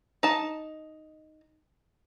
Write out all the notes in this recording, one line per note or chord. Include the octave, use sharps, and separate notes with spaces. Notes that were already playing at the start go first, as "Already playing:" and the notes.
D#4 A5